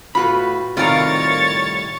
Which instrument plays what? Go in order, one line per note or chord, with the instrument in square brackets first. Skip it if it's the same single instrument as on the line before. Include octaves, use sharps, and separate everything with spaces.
[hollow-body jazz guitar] A2 B5 [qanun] F4 F#4 B4
[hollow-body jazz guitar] C2 A2 C3 [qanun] D#3 [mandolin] F4 A#4 [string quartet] C#5 A6